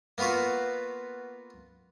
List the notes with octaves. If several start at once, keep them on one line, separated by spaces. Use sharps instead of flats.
A#3 B3 F4 F#4 B4